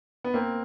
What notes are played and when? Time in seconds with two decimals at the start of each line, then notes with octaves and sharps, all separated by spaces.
0.24 B3
0.34 A#3 C4